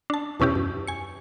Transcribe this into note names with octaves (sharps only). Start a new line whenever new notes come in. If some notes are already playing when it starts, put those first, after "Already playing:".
D4 A5
E2 B2 C#4 E4 G4
F#2
G#5 C#7